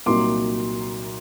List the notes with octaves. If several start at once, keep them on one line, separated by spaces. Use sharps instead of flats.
C2 A#2 F#3 A#3 D#4 C6 D6